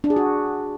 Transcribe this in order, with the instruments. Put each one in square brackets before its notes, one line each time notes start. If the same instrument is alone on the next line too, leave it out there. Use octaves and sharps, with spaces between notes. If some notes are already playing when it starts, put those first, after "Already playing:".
[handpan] D4
G#4
F#4